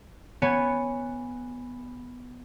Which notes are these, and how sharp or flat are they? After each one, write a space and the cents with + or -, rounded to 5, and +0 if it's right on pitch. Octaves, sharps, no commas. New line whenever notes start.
B3 +0 C#5 +0 G#5 -10